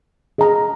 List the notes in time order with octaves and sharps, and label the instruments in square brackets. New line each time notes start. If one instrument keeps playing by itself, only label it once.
[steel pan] G#4 D#5 A#5